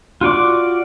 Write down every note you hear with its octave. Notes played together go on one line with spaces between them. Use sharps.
F4 F#4 D5 D6